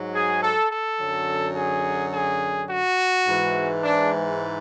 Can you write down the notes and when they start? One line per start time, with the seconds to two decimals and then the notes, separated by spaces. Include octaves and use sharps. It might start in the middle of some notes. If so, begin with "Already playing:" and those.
Already playing: G#2 F#3
0.14 G#4
0.42 A4
0.72 A4
1.00 F#2 D3 F#3
1.56 G#4
2.13 G#4
2.69 F#4
3.26 G#2 E3
3.83 D4